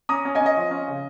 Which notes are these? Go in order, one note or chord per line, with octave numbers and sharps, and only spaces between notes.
C#4 A#5 D#6
C#4
D#5 G#5
C#4
D#5
F3
C#4
C#3